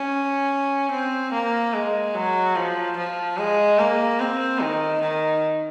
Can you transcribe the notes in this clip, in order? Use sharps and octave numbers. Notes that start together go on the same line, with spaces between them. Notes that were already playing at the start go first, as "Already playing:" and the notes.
Already playing: C#4
C4
A#3
G#3
F#3
F3
F3
G#3
A#3
C4
D#3
D#3